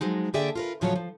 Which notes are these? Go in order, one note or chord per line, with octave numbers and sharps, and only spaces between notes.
F3 F#3 G#3 D#4
D3 A#3 G#4 D5 E5 G5
F4 A#4 B4
A2 C#3 F3 F#3 F4 C#5
F3